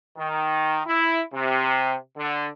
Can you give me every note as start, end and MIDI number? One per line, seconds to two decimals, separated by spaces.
0.17 0.81 51
0.86 1.21 64
1.33 1.94 48
2.17 2.48 50